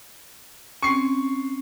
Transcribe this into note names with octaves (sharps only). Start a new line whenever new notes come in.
C4 C#4 C#6 C7